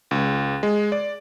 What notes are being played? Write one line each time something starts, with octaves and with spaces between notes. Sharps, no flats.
C#2
G#3
D5